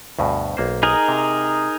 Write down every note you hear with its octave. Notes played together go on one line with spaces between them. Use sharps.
D2 G2 B2
B1 A#3 C5
D#4 G#4 A#4
C3